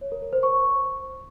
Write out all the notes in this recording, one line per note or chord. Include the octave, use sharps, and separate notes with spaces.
C#5
A#4
A#4
C5
C#6